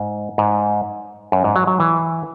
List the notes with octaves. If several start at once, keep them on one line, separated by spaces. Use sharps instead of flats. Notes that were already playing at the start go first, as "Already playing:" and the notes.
Already playing: G#2
G#2
F#2
G#2
F#3
F#3
E3